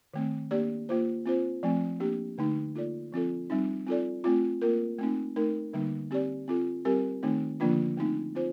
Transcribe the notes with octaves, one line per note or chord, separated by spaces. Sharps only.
D#3 A3 C4
A#3 D4 G4 D5
A#3 F4 C5
C4 F4 C5
F3 A3 C4
A#3 D4 G4
D3 A3 D#4
A#3 F4 A4 D5
F3 C4 F4 A4
G3 C4 D#4
C4 F4 A4 D5
A3 C4 F4
A#3 F4 A#4
A3 C4 D#4
A3 D#4 A#4
D3 G3 A#3 D#4
C4 G4 D5
C4 F4 A4
G3 C4 G4 A#4
D#3 A3 C4 D#4
D3 F3 A#3 D4 F4
A3 C4 D#4
C4 F4 C5